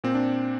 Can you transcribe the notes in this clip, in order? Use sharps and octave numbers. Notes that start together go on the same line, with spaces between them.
A#2 C4
D4